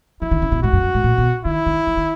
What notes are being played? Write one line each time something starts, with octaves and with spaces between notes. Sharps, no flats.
E3 E4
D#3
C#3
B2
G#2 F#4
F#2
F#2
G#2
A#2
B2
D#3 E4
D#3
E3
D#3